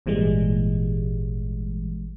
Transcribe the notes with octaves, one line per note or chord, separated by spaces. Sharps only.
G#1 A#2 E3 G3 G#3